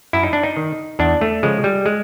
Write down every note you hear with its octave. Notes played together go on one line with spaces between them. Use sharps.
F#2 E4
D#4
D4
D#4
D#3
E2 D4
A3
C#3 F3 G#3
G3
G#3